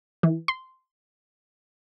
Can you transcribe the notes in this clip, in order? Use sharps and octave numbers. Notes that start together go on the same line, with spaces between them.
E3
C6